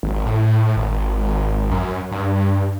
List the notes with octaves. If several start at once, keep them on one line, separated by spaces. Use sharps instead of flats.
G#1
A2
G#1
F#2
G2